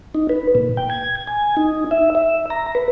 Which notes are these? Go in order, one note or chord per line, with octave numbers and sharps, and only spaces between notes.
D#4
B4
A#2
G5
G#6
G#5
D#4
E5
E5
A#5
B4